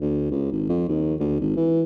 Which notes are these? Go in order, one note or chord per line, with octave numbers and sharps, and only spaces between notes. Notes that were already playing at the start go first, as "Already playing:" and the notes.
D2
C#2
G#1
F2
D#2
D2
G#1
E3